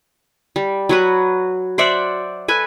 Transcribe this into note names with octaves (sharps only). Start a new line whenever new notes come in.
G3
F#3 F#4 B4
C5 D5 E5 F#5
A4 B4 G#5